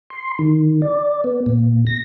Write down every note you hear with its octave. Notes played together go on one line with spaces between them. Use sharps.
C6
D#3
D5
B3
A#2
A#6